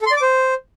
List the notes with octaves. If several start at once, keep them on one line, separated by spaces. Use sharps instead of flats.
A4
C6
D5
D6
C5